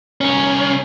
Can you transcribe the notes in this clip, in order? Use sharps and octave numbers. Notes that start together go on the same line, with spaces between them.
C2 C#4